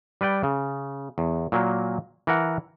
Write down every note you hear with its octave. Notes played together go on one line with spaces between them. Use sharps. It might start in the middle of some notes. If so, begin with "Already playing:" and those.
G3 B4 D5 G5
C#3
E2
A#2 F#3 A#3
E3 A#4 F#5